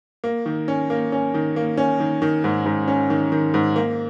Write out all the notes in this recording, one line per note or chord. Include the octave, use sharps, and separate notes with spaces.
A#3
D#3
C#4
A#3
C#4
D#3
A#3
C#4
D#3
D#3
G#2
G#2
C#4
D#3
D#3
G#2
A#3